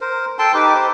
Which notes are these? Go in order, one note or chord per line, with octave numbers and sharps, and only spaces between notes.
A#4 C5
A4 G5 A5 C6
D#4 G4 B4 D6
G4 C5